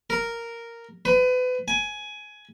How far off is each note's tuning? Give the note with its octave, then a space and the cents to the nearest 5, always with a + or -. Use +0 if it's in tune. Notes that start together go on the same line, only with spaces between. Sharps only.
A#4 -5
B4 +30
G#5 +15